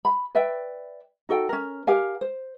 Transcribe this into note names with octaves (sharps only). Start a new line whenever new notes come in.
B5
B4 D5 E5 G5
D#4 F#4 A4 G5
C#4 A#4
G4 A#4 F5 G#5
C5